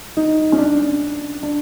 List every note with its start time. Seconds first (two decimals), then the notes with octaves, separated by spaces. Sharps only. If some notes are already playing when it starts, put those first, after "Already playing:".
0.17 D#4
0.52 C#4
0.58 D4
1.43 D4